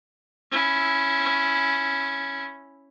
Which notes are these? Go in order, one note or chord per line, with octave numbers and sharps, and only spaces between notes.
C#4 E4